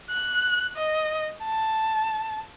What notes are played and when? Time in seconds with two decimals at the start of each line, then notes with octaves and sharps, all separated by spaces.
0.10 F#6
0.76 D#5
1.45 A5